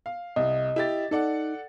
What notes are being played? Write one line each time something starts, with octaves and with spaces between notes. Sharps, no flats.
F5
C2 D#5
E4 G4 A6
D#4 A4 D5 F#5